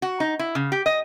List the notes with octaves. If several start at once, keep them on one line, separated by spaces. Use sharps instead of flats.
F#4
D#4
E4
C#3
G4
D#5